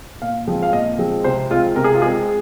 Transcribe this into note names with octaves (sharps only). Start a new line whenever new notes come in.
A#2 F5
F3 G#3 C4
F5
A#2 D#5
F3 G#3 C4
C3 C5
G#3 C4 F4
C3 A#4
G#4
F4
G#3 C4 G#4